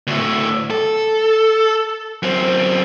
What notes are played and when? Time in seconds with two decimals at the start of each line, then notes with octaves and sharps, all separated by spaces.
0.07 D2 A2
0.70 A4
2.23 F#2 C4